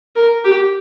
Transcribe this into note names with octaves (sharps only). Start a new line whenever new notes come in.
A#4
G4